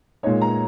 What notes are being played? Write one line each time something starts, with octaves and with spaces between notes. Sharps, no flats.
A#2 G#3 D#4 C#5
A#5